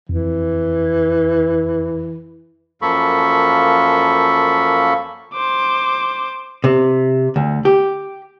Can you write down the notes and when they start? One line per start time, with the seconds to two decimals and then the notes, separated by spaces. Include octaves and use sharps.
0.09 F2 E3
2.82 F#2 F3 A#3 A4 B5 C#6
5.33 C5 D6
6.64 C3
7.36 D2
7.65 G4